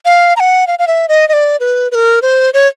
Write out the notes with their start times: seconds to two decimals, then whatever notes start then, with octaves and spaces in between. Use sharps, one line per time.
0.05 F5
0.37 A#5
0.40 F#5
0.67 F5
0.79 F5
0.87 E5
1.09 D#5
1.29 D#5
1.33 D5
1.60 B4
1.92 B4
1.95 A#4
2.22 C5
2.54 C#5